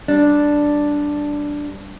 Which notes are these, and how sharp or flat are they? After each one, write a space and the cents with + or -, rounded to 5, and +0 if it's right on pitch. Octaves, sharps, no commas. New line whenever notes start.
G3 +0 D4 +0